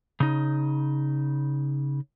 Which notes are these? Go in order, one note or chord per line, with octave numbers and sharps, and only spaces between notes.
C#3 D#4